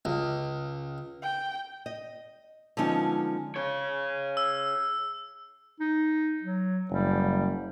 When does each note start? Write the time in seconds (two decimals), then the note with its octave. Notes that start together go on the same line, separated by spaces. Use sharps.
0.05 C#2
1.22 G5
1.86 D#5
2.77 D3 F3 G#3 B3 C#4 D#4
3.56 G#4 C#5
4.37 E6
5.80 D#4
6.43 F#3
6.91 F#1 G3